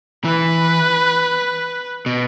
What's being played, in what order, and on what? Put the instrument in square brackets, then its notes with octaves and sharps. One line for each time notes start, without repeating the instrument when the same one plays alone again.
[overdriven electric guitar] E3 [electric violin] B4
[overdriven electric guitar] B2